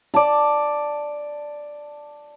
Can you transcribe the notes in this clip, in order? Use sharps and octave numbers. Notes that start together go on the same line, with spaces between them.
D5 A5